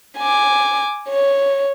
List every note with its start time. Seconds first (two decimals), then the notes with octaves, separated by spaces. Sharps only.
0.18 G#5 D6
1.09 C#5